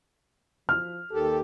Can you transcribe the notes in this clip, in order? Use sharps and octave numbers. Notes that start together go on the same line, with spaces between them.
F3 F6
D#2 D#3 G4 A4